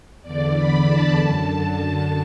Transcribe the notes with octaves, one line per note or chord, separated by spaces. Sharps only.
E2 D3 D5
B5
A5
F#2 D3